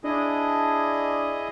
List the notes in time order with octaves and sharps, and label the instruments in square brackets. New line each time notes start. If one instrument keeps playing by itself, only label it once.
[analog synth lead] D4 [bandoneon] E4 G#4 D#5